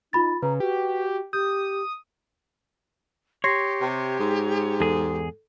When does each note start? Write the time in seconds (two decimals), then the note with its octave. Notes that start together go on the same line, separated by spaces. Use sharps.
0.13 D#4 F4 B5 A6
0.42 C#3 B4 A#5
0.60 F#4 G4
1.33 G4 D#6 G6
3.44 G4 C#5 C6 A#6 C7
3.81 C3
4.20 G#2
4.80 E2 G#4 A4